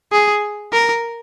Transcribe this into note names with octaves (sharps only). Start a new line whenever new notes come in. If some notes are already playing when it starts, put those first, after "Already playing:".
G#4
A#4